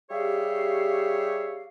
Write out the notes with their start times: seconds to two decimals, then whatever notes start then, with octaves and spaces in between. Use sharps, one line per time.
0.11 G3 G4 G#4 C#5 E5 F5